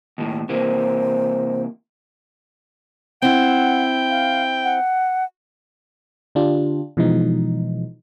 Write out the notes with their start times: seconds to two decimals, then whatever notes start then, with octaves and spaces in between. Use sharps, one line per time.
0.18 D#2 A2
0.49 C3 E3 A#3 C5
3.22 C4 E4 F#5 G5
4.10 F5
4.64 F#5
6.35 D3 D4 F4 G4
6.97 B2 E3 F3 G#3 D#4